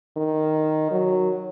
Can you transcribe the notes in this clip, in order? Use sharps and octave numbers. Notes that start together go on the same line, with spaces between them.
D#3
F#3